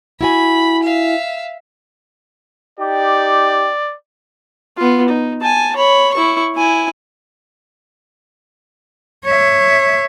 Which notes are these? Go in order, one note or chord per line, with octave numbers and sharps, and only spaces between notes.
E4 F#4 G#5 B5
E5 F5
D#4 G4 D5
B3 F4
D#4
G#5 A5
C#5 B5
E4 C#6
E4 G#5
C#5 E5